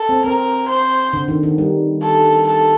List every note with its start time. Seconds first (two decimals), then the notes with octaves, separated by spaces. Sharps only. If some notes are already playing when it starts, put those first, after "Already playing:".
Already playing: A4
0.09 C4
0.24 C4 A#4
0.68 C5
1.13 D3
1.28 D#3
1.43 D#3
1.58 G3
2.02 A4
2.47 A4